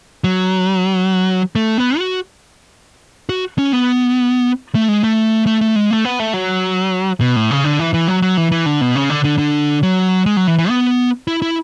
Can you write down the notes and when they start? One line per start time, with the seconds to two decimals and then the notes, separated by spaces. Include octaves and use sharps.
0.24 F#3
1.55 A3
1.78 B3
1.98 F#4
3.29 F#4
3.59 C#4
3.73 B3
4.75 A3
4.88 G#3
5.04 A3
5.47 A3
5.61 A3
5.76 G#3
5.91 A3
6.05 B3
6.19 A3
6.34 F#3
7.21 B2
7.36 A2
7.51 C#3
7.64 D3
7.79 E3
7.94 E3
8.08 F#3
8.22 F#3
8.37 E3
8.52 E3
8.66 D3
8.81 B2
8.95 C#3
9.10 D3
9.24 D3
9.38 D3
9.83 F#3
10.26 G#3
10.37 F#3
10.47 E3
10.58 E3
10.69 B3
11.27 E4
11.42 E4